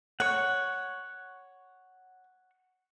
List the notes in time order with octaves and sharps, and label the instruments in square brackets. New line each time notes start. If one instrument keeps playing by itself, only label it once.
[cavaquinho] C#5 [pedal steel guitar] F#5 C#6